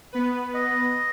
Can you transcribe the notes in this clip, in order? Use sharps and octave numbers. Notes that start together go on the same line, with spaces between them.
B3 B4
D#5